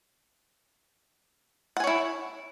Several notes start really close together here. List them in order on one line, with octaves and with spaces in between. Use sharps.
F#5 G#5 C#5 E4